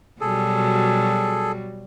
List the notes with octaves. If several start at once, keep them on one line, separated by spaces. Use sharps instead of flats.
B2 F#3 G3 G#4 A4